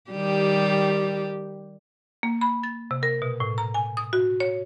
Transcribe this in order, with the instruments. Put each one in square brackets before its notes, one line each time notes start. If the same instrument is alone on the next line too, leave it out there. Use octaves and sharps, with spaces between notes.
[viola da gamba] D#3 G3 G4
[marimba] A#3
B5
A6
C3
A#4
B2
A2
A#5
G#5
D#6
F#4
C#5